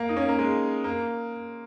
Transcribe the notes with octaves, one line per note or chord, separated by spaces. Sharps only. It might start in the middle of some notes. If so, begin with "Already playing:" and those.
Already playing: A#3
D#4
A#3 C#4
A#3
G#3
A#3